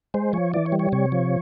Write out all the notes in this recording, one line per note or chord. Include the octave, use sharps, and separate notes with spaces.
G#3 C5
F3 C#5
E3 D5
C#5
G3
C#5
C3 C#5
F3